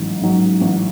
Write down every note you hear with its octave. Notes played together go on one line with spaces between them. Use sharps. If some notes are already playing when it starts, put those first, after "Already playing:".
Already playing: A1 G#2 F#3
G#2 F#3
A1